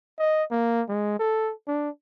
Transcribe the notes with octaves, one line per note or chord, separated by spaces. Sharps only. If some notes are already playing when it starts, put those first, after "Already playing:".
D#5
A#3
G#3
A4
D4